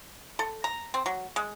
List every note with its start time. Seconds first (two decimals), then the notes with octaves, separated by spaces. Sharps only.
0.39 A4
0.64 A#5
0.94 C4
1.06 F#3
1.36 G#3